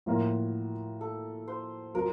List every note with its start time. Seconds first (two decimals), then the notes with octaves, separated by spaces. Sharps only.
0.06 A2 F3 A#3 F4 F#4 A#4
1.01 A4
1.48 C5
1.94 F#3 C4 F4 A#4